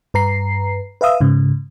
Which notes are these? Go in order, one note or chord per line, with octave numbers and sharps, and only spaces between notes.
G2 B4 A#5 C7
B4 E5 F5 D#6 E6
G#2 C#3